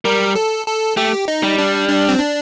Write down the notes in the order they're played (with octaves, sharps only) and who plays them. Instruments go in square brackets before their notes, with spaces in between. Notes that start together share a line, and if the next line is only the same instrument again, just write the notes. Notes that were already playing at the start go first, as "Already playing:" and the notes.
[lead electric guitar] G3 [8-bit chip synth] A#4
[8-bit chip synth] A4
A4
[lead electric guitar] A3 [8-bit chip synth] G4
[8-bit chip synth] D#4
[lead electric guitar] G3
[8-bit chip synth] D4
D4
C4
D4